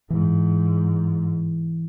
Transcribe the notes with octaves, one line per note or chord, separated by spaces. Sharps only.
G#2 E3